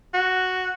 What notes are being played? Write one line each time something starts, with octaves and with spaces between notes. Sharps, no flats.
F#4